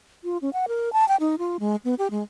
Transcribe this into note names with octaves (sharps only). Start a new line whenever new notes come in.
F4
C#4
F#5
A#4
A5
G5
D#4
F4
G#3
B3
G4
G#3